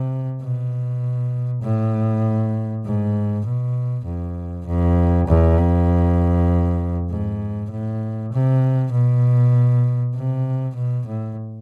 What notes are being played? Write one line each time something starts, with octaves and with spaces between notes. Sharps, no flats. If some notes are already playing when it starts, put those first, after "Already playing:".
Already playing: C3
B2
A2
G#2
B2
F2
F2
E2
F2
G#2
A2
C3
B2
C3
B2
A2